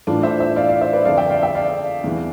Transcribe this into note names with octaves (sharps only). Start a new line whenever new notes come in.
A2 E3 D4 F4
C5 E5
C5 E5
D5 F5
D5 F5
C5 E5
B4 D5
F2 D3 D5 F5
E5 G5
D5 F5
E5 G5
D5 F5
E2 C3 E3